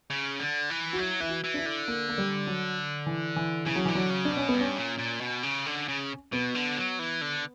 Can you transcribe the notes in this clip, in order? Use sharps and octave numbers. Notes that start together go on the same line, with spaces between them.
C#3
D3
E3
F#4
F#3 E4
E3 E4
F#4
E3
D4
E4
D3
A#3
A#3
G3
F#3
E3
E3
C#3 E3
F#3
D3 E3
F#3
C#3
D4
B2 C#4
B3
G2
C#4
A#2
A#2
B2
C#3
D3
C#3
B2 B3
D3
F#3
E3
D3